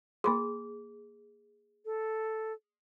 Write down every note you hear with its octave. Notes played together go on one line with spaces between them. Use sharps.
A#3 G#4 B5 C6
A4